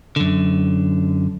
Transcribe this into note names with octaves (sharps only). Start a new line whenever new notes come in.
F#2 D3